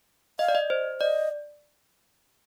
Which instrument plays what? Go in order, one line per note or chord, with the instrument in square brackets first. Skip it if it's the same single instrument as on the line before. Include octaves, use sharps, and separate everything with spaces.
[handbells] D#5 [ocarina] F5
[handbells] D5
D#5
C5
[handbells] D5 [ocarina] D#5